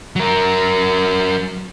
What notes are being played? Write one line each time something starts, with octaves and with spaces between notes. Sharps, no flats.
F#3 A#4